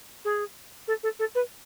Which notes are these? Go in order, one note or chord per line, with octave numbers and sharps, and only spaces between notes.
G#4
A4
A4
A4
B4